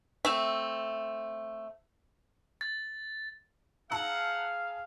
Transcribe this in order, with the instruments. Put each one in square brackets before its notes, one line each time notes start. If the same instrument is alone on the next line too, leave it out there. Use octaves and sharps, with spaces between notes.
[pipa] A3 C4 E5
[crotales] A6
[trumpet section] G#4 F5 [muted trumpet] F#5 [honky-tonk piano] A5 A#5 E6